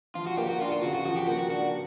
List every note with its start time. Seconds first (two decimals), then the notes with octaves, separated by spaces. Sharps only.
0.15 F3 F4
0.27 F#4
0.38 A#3 G4
0.50 F#4
0.61 D4 F4
0.72 F4
0.83 C#3 F#4
0.94 F#4
1.05 F3 F#4
1.17 G4
1.27 A#3 F#4
1.39 F#4
1.50 D4 F#4